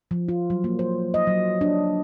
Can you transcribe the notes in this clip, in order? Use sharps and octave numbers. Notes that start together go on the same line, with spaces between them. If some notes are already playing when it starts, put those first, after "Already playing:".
F3
F4
F#3
A#3
C5
D#5
F#3
D4